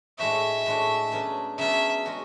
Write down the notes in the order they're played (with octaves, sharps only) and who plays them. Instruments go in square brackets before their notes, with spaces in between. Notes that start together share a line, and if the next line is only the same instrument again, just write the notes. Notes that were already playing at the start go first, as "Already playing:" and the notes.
[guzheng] A2 G#3 D4 F#4 [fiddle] E5
[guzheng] A2 G#3 D4 F#4
C#3 F#3 B3 D4
[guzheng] C#3 F#3 B3 D4 [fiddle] E5
[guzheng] G#3 C#4 F#4